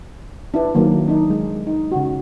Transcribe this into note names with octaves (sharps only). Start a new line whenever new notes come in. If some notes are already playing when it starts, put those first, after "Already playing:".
D4 E4 B4
D#3 F#3 A#3
D4 D#4
G#3
D#4
C#3 F#4